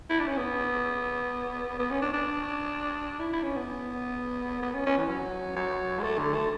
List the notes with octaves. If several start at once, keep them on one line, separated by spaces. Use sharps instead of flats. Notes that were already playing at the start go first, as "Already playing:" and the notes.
E4
D4
C#4
B3
B3
C#4
D4
D4
E4
E4
C#4
B3
B3
C#4
C#4
E3
F#3
F#3
G#3
A3
D3
A3